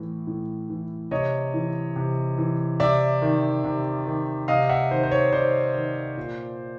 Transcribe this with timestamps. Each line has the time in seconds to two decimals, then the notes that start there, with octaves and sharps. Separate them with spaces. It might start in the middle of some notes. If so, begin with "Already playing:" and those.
Already playing: A2 E3
0.27 A2
0.70 E3
1.11 C3 C#5 D#5
1.54 E3
1.96 C3
2.38 E3
2.80 C3 D5 E5
3.22 D#3
3.64 C3
4.07 D#3
4.48 C3 D#5 F5
4.69 E5 F#5
4.91 D#3 C5
5.03 C5
5.12 C#5
5.33 C3 C5 D5
5.75 D#3
6.17 A#2